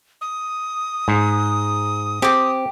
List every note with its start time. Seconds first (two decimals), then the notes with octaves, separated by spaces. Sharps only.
0.21 D#6
1.08 G#2
2.22 C4 G4 D6